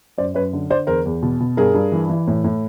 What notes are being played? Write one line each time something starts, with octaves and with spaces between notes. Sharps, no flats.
F#2 C5 D5
F#2 B4 C#5
D3
D3 C5 D5
E2 A#4 C5
E2
B2
B2
G2 G#4 A#4
G2
E3
E3
A2
A2